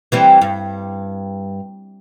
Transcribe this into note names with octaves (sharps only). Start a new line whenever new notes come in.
E3 G3 C4
G2